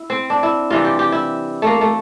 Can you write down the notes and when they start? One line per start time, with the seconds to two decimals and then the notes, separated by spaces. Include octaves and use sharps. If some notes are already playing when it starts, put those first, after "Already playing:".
Already playing: E4
0.10 C4
0.30 D4
0.43 E4
0.70 C3 E3 G3 F4
0.85 G4
0.99 G4
1.12 E4
1.62 A3 A#3
1.81 A3